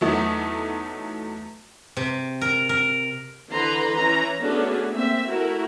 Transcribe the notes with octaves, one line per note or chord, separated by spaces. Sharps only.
E2 F#3 A3 D#4 D#6
C3
A#4
A#4
D3 E3 B4 A#5 C6
E3 C#4 A#5
A3 B3 C#4 D4 F#4 G#4
A#3 C4 E5
A3 E4 F#4 A#4